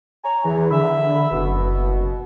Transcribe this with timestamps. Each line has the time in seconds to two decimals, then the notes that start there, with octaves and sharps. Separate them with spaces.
0.24 C#5 G#5 A#5
0.45 E2 E3
0.71 D3 E5 B5 E6
1.31 F#1 B2